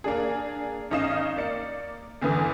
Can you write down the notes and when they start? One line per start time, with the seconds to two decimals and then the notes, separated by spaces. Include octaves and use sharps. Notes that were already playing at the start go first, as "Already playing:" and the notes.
0.04 A#3 D4 G#4
0.91 G#1 C#4 D#4 D#5 F5 E7
1.36 A#3 D5 C#7
2.22 G1 E2 D3 E3 B3 D#6